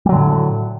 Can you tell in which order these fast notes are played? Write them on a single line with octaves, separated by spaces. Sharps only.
G3 F#3 D3 A2